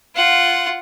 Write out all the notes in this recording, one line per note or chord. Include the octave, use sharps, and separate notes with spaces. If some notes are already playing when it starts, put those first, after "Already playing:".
F4 F#5